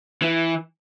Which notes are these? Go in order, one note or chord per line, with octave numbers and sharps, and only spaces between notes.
E3